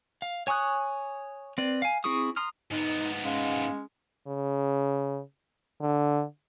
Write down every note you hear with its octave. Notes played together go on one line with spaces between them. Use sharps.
F5
C#5 G#5 C#6 D#6 F#6
C4 B4 D5
F5 G#5
C4 E4 G#4 C#6 D#6
A#5 C6 D#6 F6
G#2 B3 D#4
G#3 C#4 F5
C#3
D3